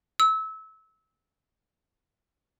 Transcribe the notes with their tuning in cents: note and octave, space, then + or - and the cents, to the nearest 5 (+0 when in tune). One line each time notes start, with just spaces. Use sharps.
E6 -25